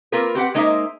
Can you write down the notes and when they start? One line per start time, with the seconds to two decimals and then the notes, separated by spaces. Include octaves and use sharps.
0.12 A#3 C4 F4 A#4 B4
0.35 C4 G4 B4 F#5
0.54 G#3 A#3 D#4 C5 C#5 E5